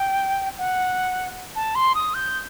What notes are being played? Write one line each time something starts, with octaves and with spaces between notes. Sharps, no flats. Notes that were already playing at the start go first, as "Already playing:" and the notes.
Already playing: G5
F#5
A5
C6
D#6
G6